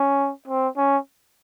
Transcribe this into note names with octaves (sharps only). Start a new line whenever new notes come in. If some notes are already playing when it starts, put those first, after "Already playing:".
Already playing: C#4
C4
C#4